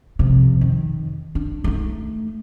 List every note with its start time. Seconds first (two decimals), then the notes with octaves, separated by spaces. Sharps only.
0.19 F2 C3
0.61 D#3
1.35 D4
1.64 A3 D#4